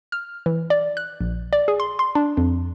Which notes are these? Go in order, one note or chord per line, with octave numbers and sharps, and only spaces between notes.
F6
E3
D5
F#6
A#1
D5
G#4
C6
C6
D4
F2